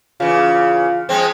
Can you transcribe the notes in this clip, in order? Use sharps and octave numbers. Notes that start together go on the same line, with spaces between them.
C#3 E3 F4
F3 G#3 C4